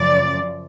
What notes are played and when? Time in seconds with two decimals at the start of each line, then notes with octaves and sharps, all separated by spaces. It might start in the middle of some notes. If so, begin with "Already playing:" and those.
Already playing: F#2 C#3 F3 D5